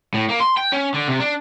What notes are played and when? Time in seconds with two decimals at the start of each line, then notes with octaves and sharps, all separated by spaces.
0.14 A2
0.29 A#3
0.41 C6
0.58 G5
0.73 C#4
0.94 D3
1.08 C3
1.20 D4